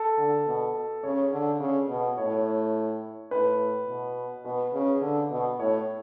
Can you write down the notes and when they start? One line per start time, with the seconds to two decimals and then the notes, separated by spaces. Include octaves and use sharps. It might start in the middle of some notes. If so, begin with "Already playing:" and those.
Already playing: A4
0.18 D3
0.46 B2
1.03 C#3 C#5
1.32 D3
1.60 C#3
1.88 B2
2.17 A2 C#5
3.31 A2 B4
3.88 B2
4.44 B2 B4
4.73 C#3
5.02 D3
5.31 B2
5.59 A2 C#5